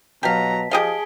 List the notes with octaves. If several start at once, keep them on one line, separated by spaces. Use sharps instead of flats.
B2 F#3 G4 F5 A5 A#5 B6
F3 G4 G#4 D#5 F5 A5 D7 G7